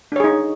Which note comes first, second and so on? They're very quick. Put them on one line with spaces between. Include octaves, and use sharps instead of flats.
D4 C#5 G#4 D#4